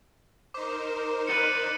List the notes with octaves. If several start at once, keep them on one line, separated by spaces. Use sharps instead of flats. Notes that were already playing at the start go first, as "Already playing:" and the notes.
D#4 A#4 C5 D6
B4 D5 C#7 D#7